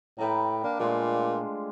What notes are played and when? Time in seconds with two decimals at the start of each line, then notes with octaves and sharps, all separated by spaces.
0.18 A2 B4 G5 A#5
0.64 A#3 D4
0.79 A#2 G#3 A3 F4